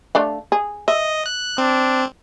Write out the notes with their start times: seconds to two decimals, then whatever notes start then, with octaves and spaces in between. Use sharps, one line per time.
0.15 A3 D4 F5
0.52 G#4
0.88 D#5 E5
1.26 F#6
1.58 C4 D4